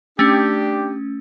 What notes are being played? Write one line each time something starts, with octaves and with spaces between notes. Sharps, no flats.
A3 C#4 D4 G4